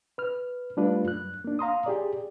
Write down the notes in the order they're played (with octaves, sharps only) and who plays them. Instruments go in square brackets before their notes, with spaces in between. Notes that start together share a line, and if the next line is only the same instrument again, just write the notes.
[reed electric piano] B4 F6
G3 A3 D4 F4 B4
F#2 F#6
A#3 D4
F5 A#5 C6 D#6
G4 G#4 D5